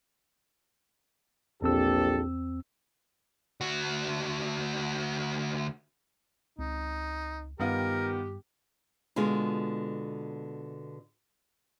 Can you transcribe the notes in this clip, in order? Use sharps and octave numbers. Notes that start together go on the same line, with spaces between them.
A#1 E2 C4 G4 A4 E6
D2 F#4
C#2 C4 D#4
G2 D#3 B3 F4 G4 A#4
B2 D3 G#3 F4